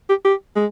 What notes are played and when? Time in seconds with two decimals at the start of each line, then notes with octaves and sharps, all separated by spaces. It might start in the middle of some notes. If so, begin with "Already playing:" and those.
0.09 G4
0.25 G4
0.56 G#3